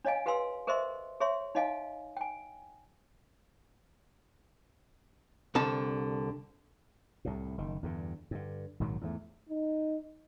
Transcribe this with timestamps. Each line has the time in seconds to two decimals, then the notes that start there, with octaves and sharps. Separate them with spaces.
0.05 D4 C#5 D#5 F5 G#5
0.26 G4 B4 F5 G#5 C6 E6
0.67 G#4 A#4 C5 D#5 E5 C6
1.21 G#4 C#5 E5 C6
1.55 D#4 C#5 D#5 F5 G#5
2.17 G5 G#5
5.55 C2 D3 A5
7.25 C2 A2
7.58 F#1 D#3
7.83 E2 G2 D3
8.31 G2 D3
8.80 A#1 G#2 D#3 F#3
9.01 E2 G#2 A3
9.49 D#4